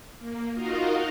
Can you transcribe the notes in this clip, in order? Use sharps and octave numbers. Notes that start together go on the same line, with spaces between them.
A#3
D#4 F4 F#4 A#4 D#5 F5